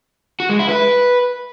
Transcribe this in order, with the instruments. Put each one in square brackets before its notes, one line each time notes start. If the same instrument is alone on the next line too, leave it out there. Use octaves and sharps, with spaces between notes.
[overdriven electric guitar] F#4
G#3
E4
B4